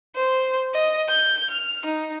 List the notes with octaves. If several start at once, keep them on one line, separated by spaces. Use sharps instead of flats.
C5
D#5
G6
F6
D#4